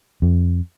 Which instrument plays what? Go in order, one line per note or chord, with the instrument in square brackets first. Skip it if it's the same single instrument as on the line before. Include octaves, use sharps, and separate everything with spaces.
[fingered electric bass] F2